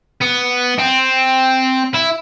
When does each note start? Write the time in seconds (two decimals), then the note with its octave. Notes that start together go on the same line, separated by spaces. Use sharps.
0.21 B3
0.78 C4
1.94 E4